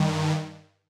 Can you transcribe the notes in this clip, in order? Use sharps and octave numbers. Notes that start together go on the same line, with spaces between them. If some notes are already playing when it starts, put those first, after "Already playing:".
Already playing: G2 D#3